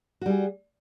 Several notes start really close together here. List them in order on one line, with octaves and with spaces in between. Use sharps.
F#4 G3 G#4